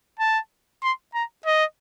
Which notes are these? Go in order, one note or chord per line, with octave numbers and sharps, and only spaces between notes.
A5
C6
A#5
D#5